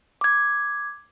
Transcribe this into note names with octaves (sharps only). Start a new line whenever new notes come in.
D6 G#6